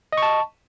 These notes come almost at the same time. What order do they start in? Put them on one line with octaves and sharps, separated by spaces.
D#5 C#6 A5